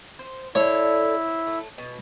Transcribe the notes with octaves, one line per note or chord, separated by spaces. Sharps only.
C5
D3 E4 A4 C#5
C4
A3
B2